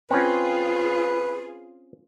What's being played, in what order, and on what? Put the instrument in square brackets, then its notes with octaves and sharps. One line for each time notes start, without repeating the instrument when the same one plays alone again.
[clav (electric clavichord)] C4 C#4 [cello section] F4 G#4 [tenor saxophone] B4